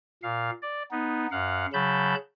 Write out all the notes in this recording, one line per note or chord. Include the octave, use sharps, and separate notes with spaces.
A#2 F5
D5
B3 D#4
F#2 F5 F#5
C#3 F#3 A5 B5 G6